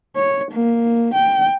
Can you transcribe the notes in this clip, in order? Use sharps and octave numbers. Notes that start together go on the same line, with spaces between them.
C#5
A#3
G5